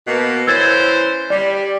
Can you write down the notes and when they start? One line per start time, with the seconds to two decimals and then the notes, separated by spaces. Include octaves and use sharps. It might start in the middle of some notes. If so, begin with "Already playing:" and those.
0.07 B2 A#3
0.47 E3 C#4 C5 E6 G#6 A6
1.30 G3 D5